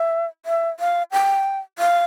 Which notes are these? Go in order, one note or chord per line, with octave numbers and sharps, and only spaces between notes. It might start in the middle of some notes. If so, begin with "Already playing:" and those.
Already playing: E5
E5
F5
G5
F5